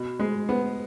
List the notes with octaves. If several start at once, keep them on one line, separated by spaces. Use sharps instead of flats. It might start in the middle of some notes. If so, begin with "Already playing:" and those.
Already playing: B2
G#3
B3